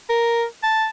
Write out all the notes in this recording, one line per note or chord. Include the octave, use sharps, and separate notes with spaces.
A#4
A5